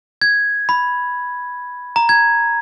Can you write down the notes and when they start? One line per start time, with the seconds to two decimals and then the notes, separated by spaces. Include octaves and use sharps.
0.22 G#6
0.69 B5
1.96 A#5
2.09 G#6